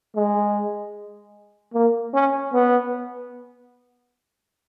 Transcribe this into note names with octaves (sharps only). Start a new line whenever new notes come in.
G#3
A#3
C#4
B3